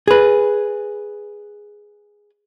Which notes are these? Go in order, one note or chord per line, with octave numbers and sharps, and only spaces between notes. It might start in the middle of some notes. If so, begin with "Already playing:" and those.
G#4 B4